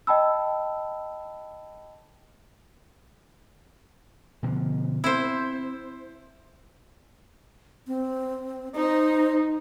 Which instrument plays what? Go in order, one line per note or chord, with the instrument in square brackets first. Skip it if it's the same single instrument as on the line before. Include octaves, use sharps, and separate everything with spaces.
[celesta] D#5 G5 A5 B5 E6
[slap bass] B2 D3 F3
[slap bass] C4 [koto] E4 C5
[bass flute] C4
[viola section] D#4 [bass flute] C5